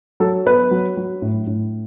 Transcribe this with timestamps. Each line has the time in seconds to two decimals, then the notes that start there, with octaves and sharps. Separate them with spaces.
0.20 F#3 A4
0.46 B3 B4
0.71 F#3
0.97 F#3
1.22 A2
1.47 A2